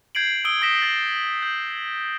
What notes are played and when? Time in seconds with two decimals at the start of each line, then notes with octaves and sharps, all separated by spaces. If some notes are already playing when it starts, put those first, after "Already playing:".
0.15 G6 G#6 C7 D7 F#7
0.45 D#6 E6 D7 G7
0.62 D#6 G#6 A#6 B6 E7 G7
0.82 G6 A6
1.42 G6